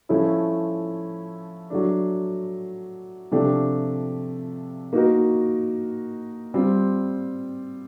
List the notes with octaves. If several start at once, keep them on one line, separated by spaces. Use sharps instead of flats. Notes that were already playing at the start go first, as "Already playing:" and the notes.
F3 A3 C#4 E4
F#3 A3 D4
C3 F3 A3 D4 G4
A#3 D#4 F#4 A#4
G3 C4 F4